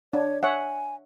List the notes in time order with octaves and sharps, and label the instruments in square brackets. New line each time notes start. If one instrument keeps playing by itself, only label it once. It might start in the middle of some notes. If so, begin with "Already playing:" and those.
[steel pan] D4 [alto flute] C#5
[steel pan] C#5 E5 F#5 [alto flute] G#5